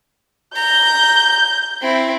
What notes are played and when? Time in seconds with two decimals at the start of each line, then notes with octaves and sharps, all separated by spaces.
0.56 A#5 G6
1.81 C4 E4